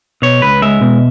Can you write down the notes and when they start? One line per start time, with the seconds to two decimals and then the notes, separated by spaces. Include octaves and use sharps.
0.22 B2 C#5
0.42 C#2 B4
0.62 G#3 E5
0.81 B2